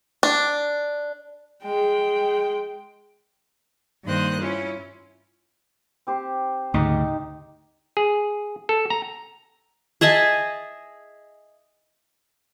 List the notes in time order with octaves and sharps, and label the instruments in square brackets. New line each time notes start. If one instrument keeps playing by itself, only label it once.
[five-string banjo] D4
[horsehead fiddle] G#3 G5
[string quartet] G2 D#3 A#3 C5 D#6 F#6
C#4 E4 F4
[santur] C4 G4 C5
[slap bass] D2 G#2 C#3 [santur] D#4 D6
[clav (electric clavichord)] G#4
A4
A#5
[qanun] G#4 D#5 E5 A5